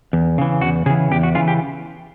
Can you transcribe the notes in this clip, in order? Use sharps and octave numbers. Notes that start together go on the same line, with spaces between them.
E2
C#3 E3
E2 F#4
C#3 E3 G#4
E2 G4
F#4
C#3 E3 F4
G4